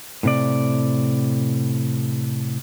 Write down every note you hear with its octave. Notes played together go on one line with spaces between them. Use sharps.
A2 C3 D5